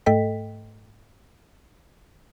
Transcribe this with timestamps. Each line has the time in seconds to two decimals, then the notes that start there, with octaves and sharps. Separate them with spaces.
0.06 G#2 A3 A4 D#5 G5 B6